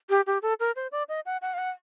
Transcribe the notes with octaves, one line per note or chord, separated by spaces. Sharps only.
G4
G4
A4
A#4
C5
D5
D#5
F#5
F#5
F5
F#5